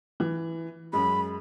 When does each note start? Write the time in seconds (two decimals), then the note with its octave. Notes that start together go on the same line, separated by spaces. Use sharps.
0.20 E3
0.93 F#2 G#3 B5